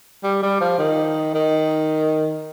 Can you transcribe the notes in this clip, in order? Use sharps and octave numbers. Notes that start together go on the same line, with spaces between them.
G3
G3
F3
D#3
D#3